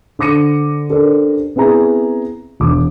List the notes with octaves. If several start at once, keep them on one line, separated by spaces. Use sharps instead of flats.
D3 C5 D6 A#6 C#7 D#7
C#4 D4 G4 A4 A#4 C5
B3 C4 E4 G#4 A#5
E1 D6